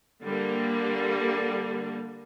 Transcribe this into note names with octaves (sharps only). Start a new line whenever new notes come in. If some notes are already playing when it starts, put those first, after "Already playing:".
D3 G3 A#3